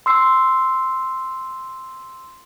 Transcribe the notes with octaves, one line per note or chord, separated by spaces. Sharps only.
C6 E6 C7